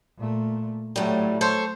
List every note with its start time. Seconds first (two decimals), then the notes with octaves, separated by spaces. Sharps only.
0.18 A#2 A3
0.96 A2 F#3 G3 A3
1.41 A4 C5 C#5